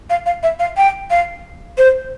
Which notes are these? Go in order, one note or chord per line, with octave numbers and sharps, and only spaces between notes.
F5
F5
E5
F5
G5
F5
C5